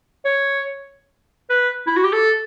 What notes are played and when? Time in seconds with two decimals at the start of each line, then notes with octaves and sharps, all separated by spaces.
0.25 C#5
1.50 B4
1.87 E4
1.96 F#4
2.04 G4
2.13 A4